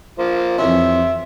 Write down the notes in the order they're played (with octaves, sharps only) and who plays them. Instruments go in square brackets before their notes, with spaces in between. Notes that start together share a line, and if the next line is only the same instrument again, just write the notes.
[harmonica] F3 A#3 C5
[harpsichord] F2 E3 C#4 [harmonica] E5 C6